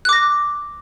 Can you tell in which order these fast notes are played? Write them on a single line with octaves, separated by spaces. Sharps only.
F#6 D6 A#6